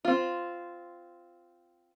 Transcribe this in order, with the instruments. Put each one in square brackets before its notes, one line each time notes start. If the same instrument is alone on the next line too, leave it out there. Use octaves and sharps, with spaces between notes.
[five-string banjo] C4 F4